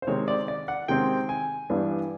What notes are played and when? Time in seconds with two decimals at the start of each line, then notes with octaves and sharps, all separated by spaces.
0.02 C5
0.07 C3 D#3 G#3 C4 C#5
0.28 D5
0.48 D5
0.68 F#5
0.88 C3 D#3 G#3 C4 G5
1.29 G#5
1.70 G2 E3 G3 B3 D4